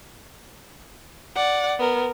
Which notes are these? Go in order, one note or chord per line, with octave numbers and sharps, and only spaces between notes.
D5 F#5
B3 A#4